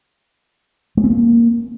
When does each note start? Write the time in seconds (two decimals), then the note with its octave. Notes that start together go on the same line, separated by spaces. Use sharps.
0.97 G#3
1.04 C4
1.10 A#3